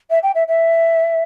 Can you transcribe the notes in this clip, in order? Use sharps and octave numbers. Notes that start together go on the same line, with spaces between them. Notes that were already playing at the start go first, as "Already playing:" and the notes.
E5
G5
E5
E5